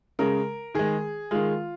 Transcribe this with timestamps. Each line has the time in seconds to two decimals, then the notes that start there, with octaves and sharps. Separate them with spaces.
0.19 C#3 G#3 A#4
0.75 D#3 G#3 G#4
1.31 D#3 G#3 F4